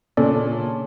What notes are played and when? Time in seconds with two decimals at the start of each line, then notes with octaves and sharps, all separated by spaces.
0.17 A#2 C#3 C#4 D4 A4 D5